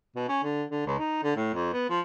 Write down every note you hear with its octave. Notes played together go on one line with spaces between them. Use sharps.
B2
C#4
D3
D3
C#2
D#4
D3
A2
F2
B3
F3